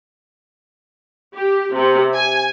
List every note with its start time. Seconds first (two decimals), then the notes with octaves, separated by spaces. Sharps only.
1.36 G4
1.75 C3
2.15 G#5